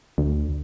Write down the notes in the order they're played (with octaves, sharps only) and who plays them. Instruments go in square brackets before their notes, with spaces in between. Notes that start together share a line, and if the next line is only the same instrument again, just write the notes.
[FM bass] D2